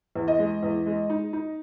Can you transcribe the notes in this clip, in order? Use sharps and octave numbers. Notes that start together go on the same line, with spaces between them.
E2
D#5
G#3
E2
G#3
D#4
D#4